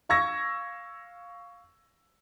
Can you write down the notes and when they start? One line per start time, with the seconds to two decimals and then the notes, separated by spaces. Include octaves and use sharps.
0.09 F5 C#6 E6 G#6 A#6